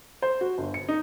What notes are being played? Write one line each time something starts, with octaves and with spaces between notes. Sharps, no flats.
C5
F#4
G1
C#7
D#4